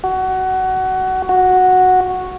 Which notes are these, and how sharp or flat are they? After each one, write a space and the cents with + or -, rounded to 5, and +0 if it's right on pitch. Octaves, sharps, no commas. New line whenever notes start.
F#4 +20
F#4 -5